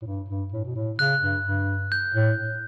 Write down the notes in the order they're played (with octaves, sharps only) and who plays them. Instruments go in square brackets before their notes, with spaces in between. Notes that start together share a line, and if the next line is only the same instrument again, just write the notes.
[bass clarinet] A2
G2
G2
A2
B2
A2
[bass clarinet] C#3 [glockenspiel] F#6
[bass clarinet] G2
G2
[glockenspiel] G6
[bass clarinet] A2